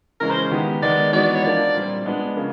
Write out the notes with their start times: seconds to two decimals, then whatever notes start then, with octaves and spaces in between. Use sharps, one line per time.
0.20 C#3 E3 G#3 C#4 A#4
0.30 C5
0.51 D#3 G#3 B3 D#4 G4
0.82 D#3 G#3 B3 D5
1.12 E3 G#3 B3 D#4 F#4 D5
1.35 C#5
1.44 F3 A#3 D4 D5
1.74 A#2 G3 C4
2.05 G#3 B3 D4
2.36 C#3 F3 A#3